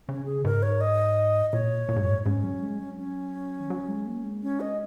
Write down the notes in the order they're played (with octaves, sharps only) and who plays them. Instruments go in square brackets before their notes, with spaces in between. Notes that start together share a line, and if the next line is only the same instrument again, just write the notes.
[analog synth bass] C#3 [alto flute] C#4
[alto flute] G#4
[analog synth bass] G#2 [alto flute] A#4
[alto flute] C#5
D#5
[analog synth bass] A#2 [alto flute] C#5
[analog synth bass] A#2
G#2
F#2
G#2
[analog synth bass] G#2 [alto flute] C#4
[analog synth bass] F#3
G#3
F#3
[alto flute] C#4
[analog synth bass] D#3
F#3
G#3
A#3
G#3
[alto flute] C#4
D#5